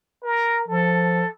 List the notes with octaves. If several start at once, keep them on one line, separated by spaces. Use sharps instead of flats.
A#4
F3 A4